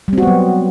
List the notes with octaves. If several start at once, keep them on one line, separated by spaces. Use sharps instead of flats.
F#3 G3 B3 C4 F#4